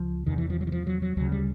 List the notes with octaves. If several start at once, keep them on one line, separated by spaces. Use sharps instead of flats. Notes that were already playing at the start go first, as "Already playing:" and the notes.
Already playing: C#2 C#3 F3
E2 C3 D#3
E3
F3
F#3
E3
F3
F#3
F#3
D2 C#3 F#3
G3